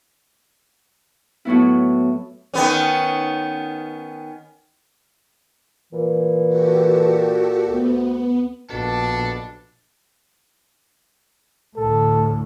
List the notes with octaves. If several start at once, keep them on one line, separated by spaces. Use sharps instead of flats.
A2 F#3 B3 E4
D#3 B3 C#4
A#2 E3
F#4 G4 A4
D2 B3
A#1 B2 D4 A4
D2 A2 A4